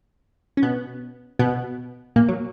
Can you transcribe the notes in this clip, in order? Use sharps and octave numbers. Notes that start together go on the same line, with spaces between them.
C#4
B2 B3
B2 B3
A#2 A#3
F#3